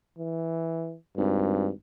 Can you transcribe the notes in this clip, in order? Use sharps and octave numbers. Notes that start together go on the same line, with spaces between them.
E3
G#1 G2